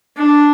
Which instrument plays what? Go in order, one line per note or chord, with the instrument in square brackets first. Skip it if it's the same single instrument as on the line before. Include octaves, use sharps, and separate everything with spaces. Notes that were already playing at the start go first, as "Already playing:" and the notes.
[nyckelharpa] D4